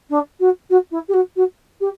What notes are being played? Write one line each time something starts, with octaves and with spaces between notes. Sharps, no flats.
D4
F#4
F#4
E4
G4
F#4
F#4
G4